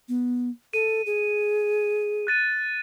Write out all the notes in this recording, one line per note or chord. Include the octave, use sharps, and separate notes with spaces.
B3
A4 D#7
G#4
F#6 A6 D#7